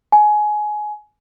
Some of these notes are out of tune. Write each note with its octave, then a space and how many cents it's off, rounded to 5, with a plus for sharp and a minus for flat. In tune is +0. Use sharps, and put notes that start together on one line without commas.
G#5 +20